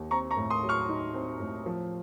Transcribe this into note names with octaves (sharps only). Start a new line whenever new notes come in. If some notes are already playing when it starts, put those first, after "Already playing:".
Already playing: D#2
C4 A#5 C#6
A#5 C#6
A2
C6 D#6
F#3
C#6 F6
D#4
C4
A2
F3